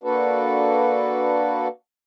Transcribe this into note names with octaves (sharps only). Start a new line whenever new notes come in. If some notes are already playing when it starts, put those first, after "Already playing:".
A#3 D4 F#4 A4 B4